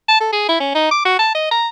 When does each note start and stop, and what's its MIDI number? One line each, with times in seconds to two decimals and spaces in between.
0.08 0.20 81
0.20 0.29 69
0.33 0.44 68
0.49 0.59 64
0.60 0.73 61
0.75 0.90 63
0.91 1.01 86
1.05 1.18 66
1.19 1.30 81
1.35 1.49 75
1.51 1.68 82